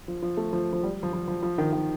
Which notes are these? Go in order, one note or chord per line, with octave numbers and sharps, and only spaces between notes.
F3
F3
A3
F3
F3
G3
F3
F3
F3
F3
D#3
D#3